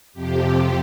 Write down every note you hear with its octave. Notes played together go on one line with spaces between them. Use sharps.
F2 C3 F3 G4